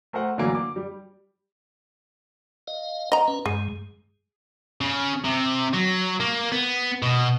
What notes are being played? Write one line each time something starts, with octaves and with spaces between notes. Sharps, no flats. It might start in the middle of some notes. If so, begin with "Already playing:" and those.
A3 A#4 C5 F#5
A#2 D3 E3 F#3 A#3
D6
G3
D#5 F5
D#5 A#5
C#4 B4
G2 G#3 G#4
C#3
C3
F#3
A#3
B3
B2